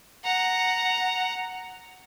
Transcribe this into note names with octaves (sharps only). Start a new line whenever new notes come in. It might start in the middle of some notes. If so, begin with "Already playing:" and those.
F#5 A#5